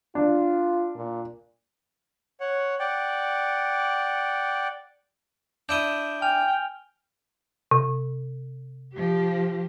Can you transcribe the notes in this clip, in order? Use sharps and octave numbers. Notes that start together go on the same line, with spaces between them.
D4 F4
A#2
C#5 F#5
D5 F#5 G5
D4 E4 D#6 G6 D7 G7
G5 G#5 F6 F7
C3
F3 G4